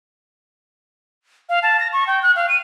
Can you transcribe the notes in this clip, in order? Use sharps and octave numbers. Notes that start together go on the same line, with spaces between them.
F5
A5
A#6
C#6
G5
F#6
F5
D#7